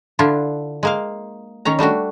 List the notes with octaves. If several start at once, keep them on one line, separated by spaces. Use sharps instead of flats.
D3 D4 E4 F4
G#3 A#3 F5
D#3 C#4 C#5 A#5
G3 A3 D4 F#4